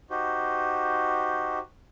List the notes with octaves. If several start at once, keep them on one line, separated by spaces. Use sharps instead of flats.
D#4 F#4 G4 C5